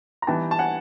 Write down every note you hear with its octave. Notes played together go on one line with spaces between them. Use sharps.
A#5
E3 G3 B3 D#4 G5 A5
A5
F#5 G#5